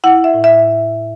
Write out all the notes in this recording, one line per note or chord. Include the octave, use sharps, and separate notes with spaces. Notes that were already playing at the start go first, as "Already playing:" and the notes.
E4 F#5
E5
A2
E5